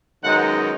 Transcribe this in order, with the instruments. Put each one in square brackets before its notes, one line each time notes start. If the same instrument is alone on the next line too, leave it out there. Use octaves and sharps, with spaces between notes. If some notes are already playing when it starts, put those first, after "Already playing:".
[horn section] F#2 D#3 G#3 B3 D#4 F#5